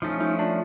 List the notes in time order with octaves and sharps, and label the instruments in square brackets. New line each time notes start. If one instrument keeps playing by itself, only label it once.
[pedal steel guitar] F3 A3 C#4 [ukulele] D#4
[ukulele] D#4
D4